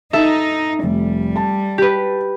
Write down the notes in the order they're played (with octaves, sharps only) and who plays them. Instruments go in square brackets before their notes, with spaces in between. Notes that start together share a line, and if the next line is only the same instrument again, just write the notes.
[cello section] D#4 [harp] A4 E5
[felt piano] F1 [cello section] G3
[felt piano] A5
[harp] G4 B4